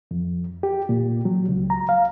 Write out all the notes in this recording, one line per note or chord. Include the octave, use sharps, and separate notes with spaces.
F2
G4
A#2
F#3
C#2
A#5
F5